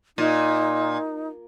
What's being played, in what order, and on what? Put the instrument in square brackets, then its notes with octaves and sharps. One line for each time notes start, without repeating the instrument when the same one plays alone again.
[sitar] A#2 [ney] D#4